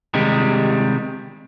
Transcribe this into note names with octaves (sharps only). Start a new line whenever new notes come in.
C3 D#3 G3 G#3